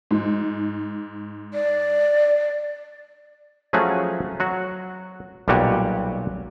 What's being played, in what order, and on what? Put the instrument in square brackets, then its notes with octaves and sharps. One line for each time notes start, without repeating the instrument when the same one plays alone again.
[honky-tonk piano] G#2
[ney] D5
[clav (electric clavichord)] F3 F#3 A3 C#4 F#4 G#4
F#3 F#4
B1 A#2 G3 F#4 G4 G#5